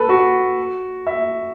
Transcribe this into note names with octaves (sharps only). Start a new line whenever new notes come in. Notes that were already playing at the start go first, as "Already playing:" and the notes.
Already playing: A4 B4
F#4
E5